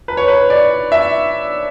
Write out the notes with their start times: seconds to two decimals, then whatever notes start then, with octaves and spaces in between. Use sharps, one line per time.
0.08 B4
0.17 C#5
0.28 B4
0.50 D5
0.92 E5